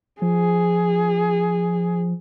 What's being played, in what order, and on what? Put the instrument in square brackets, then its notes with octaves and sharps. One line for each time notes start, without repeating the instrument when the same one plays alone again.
[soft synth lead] F3 [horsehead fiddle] G#4